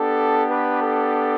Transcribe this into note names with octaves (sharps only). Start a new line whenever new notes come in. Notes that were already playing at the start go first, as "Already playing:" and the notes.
Already playing: B3 D4 G4 A4
B4
A4